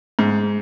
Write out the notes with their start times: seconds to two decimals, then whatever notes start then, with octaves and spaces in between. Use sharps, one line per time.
0.19 G#2